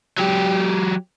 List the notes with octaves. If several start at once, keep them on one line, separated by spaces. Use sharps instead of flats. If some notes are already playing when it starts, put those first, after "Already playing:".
F#3 G4